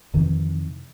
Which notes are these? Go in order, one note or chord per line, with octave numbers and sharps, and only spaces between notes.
F2 C3 D#3 E3